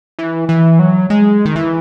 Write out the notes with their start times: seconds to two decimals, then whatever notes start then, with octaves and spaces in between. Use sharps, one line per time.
0.19 E3
0.49 E3
0.79 F#3
1.10 G#3
1.45 D#3
1.56 E3